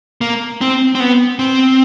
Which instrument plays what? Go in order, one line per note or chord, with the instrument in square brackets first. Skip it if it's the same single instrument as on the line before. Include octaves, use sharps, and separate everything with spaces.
[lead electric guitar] A#3
C4
C4
B3
C4